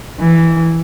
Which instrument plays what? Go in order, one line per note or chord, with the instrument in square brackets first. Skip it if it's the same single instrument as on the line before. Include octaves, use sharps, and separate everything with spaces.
[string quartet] E3